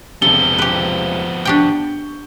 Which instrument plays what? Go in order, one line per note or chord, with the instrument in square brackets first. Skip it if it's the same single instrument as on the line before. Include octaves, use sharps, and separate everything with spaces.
[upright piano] E1 C3 [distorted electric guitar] F3 B3 [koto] A4 [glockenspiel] G7
[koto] G4 B4
[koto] D4 G4 G5 [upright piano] C#6 G6